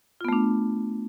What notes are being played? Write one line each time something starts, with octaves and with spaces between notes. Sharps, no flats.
A3 B3 D4 F4